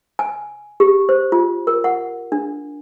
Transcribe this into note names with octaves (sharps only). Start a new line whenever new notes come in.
G#5
G4
C5
F4
A#4
F#5
D4